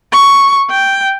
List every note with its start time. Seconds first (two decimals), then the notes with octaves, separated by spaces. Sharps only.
0.12 C#6
0.70 G5